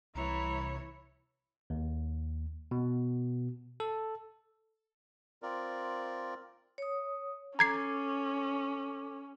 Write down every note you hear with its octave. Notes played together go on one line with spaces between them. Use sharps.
C2 E3 E4 C#5 A#5
D#2
B2
A4
C4 F4 A#4 D5
C#5 D#6
C#4 A4 A#5 D6 G#6 C7